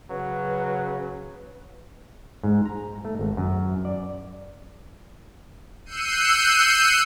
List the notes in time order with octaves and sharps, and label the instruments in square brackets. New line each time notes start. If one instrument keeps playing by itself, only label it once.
[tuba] C#3 [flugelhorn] F#3 [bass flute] B4
[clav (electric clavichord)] G#2
A#5
A3
G#1
F#2
D5
[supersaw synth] E6 F#6 G6 C7 C#7 D#7